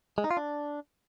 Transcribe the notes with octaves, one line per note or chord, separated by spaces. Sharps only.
G#3
D#4
F4
D4